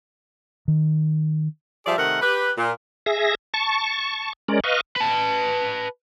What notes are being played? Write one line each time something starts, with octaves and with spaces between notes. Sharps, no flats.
D#3
F3 G3 G#4 D5 E5
C3 D#3 A3 A#4 F#5
G4 B4
A#2
G#4 E5 A#6
A5 C#6
G#3 C#4 A#4 D5
B4 D#5 F5 C#6
B4 A5